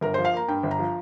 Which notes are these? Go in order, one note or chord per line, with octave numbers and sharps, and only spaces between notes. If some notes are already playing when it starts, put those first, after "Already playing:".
G1 A#4
F3 C5
F5
A#3 A#5
G2 G5
G1
A#5
F3